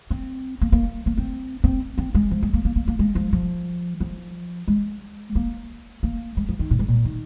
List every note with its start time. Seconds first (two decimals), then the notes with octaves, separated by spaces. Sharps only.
0.11 C4
0.61 A#3
0.72 A#3
1.06 A#3
1.17 C4
1.64 C4
1.98 C4
2.15 G#3
2.31 F3
2.43 G#3
2.53 A#3
2.65 A#3
2.76 A#3
2.88 A#3
2.99 G#3
3.15 F3
3.33 F3
4.01 F3
4.68 G#3
5.35 A#3
6.03 A#3
6.37 G#3
6.49 F3
6.59 D#3
6.71 A#2
6.79 G#2
6.88 A#2
7.05 D#3